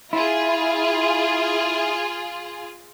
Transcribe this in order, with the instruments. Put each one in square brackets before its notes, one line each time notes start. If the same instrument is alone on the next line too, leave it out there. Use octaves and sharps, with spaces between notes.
[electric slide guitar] E4 [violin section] F4 G#4